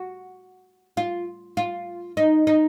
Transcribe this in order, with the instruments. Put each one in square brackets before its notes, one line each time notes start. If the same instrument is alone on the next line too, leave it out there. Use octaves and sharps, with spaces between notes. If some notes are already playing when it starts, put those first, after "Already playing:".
Already playing: [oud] F#4
F4
F4
D#4
D#4